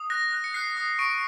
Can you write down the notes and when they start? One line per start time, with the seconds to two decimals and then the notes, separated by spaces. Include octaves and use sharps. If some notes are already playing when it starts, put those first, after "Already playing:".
Already playing: D#6
0.10 F#6 A#6
0.32 F#6
0.44 C#7
0.54 F#6 C7
0.76 D#6
0.99 C#6 D7